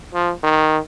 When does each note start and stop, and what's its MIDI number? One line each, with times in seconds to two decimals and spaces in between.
0.14 0.32 53
0.44 0.78 51